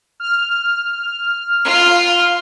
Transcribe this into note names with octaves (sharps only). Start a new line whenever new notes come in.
F6
F4 F5